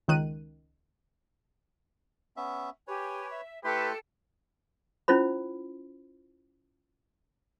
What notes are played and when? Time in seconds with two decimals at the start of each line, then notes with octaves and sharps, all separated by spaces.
0.08 C#2 D#3 F#6 D#7
2.37 B3 C#4 E5
2.88 G4 B4 C#5 G#5
3.29 E5
3.64 A3 E4 G4 A4 B4 G5 C6
5.08 C#4 E4 F4 C5 B5